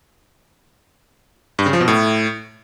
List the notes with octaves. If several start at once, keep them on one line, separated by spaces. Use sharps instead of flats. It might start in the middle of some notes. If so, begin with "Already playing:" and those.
G2
C#3
F3
B2
A2